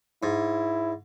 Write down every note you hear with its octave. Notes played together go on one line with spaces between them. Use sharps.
G#2 E4